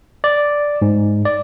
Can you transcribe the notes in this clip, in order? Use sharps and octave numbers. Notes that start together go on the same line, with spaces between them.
D5
G#2
D5